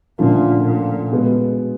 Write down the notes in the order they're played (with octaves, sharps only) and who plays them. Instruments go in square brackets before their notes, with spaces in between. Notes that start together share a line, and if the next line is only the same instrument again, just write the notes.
[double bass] A#2 [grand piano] D3 F3 A3 C#4 F4
[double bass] A#2
[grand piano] B2 G#3 B3